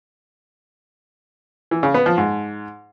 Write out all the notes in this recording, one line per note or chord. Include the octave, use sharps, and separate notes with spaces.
E3
C#3
B3
F3
G#2